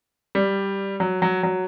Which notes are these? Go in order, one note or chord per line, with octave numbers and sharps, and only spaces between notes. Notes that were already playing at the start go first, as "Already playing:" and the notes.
G3
F#3
F#3
F#3